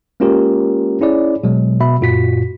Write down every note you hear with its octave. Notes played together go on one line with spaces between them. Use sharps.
G#3 A#3 C#4 F4 G4 A#4
C#4 E4 G#4 C#5 D5
B2 F#3 G#3
B2 E5 B5
F#2 A#2 F4 F#4 B6